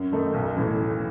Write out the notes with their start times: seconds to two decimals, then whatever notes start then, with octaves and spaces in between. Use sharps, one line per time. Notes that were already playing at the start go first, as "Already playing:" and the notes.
Already playing: F#2
0.12 D#3 A3 D#4
0.34 B1
0.57 A2 E3